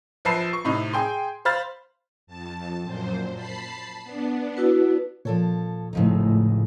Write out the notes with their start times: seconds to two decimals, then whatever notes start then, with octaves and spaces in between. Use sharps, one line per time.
0.25 A#1 B4 C5 A5 C7
0.53 C#6
0.65 A2 C3 D#4
0.93 G#4 G5 C6
1.45 C5 F5 B5 F6 A6
2.27 F2 A5
2.82 F#2 A#2 C5
3.34 A5 B5 C7
4.04 B3 D4
4.57 E4 F#4 B4
5.25 A#2 F3 A4 C#5
5.93 G#1 F2 A2 C#3 F3 D#4